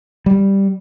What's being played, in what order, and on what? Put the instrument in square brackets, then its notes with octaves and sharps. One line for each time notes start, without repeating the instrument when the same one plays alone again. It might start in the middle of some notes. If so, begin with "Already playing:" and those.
[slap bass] G3